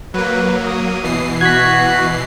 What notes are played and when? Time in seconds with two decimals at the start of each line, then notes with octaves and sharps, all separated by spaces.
0.14 F#3 A#3 B4
0.67 D#6
1.03 B2 E3 C7
1.41 F#4 F#6 G#6 B6